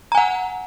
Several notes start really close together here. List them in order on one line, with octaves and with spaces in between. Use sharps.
A#5 G#5 F#5